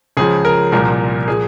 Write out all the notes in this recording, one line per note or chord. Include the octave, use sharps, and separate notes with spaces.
C#2 C#3 F3 G#4
A#4
C2 A#2 F3 A#4
A#2 F3 G#4